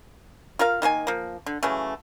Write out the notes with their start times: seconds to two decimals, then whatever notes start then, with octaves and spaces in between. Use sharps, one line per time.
0.59 F4 A#4 F5
0.82 D#3 A#3 F#4 G#5
1.07 F3 A#3
1.46 D3
1.63 C#3 E3 F#3 A3